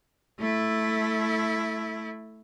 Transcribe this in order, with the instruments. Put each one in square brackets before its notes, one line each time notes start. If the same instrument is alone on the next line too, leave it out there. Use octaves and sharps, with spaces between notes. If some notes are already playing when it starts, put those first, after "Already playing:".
[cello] A3 E4